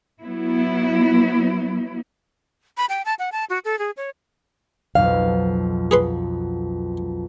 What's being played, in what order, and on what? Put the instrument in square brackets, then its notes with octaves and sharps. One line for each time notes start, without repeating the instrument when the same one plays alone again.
[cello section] F#3 B3 E4
[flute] B5
G5
A5
F#5
A5
F#4
A4
G#4
C#5
[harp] B1 F2 B2 [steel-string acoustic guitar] F5
[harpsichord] G#4 B4 C6